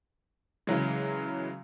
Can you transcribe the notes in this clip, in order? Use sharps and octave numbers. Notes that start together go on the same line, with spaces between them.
C#3 E3 F#3 G#3